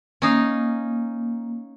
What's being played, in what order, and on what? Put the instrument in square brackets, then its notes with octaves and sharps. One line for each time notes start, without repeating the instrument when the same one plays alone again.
[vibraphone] A#3 [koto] C#4 D#4 F5